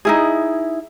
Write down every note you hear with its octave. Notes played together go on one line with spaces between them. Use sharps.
D#4 E4 G#4